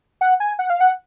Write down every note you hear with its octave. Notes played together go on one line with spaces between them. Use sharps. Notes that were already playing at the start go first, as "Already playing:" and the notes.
F#5
G#5
F#5
F5
F#5